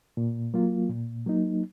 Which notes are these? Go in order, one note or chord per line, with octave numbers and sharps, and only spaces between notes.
A#2
F#3 A#3 F4
A#2
F#3 A#3 D#4